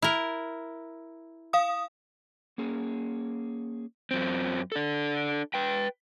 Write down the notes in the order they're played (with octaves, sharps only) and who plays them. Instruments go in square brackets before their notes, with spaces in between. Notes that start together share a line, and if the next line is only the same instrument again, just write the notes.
[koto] E4 A#4
[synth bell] F5 D#6
[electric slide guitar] A#3 C#4 G#4
F#2 C4
D4 A4
B4 G5